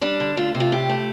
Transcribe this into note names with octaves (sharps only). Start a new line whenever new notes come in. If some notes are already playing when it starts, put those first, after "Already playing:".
G3 D4
D3
A3 F4
C3
F4
A2 G4
A3